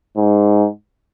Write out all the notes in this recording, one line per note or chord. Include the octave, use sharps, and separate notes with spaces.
G#2